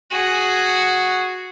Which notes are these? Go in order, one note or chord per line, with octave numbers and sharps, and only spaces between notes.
F#4 G#4